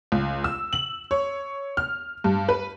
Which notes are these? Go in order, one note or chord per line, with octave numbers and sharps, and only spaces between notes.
C#2
E6
F#7
C#5
F6
G2
B4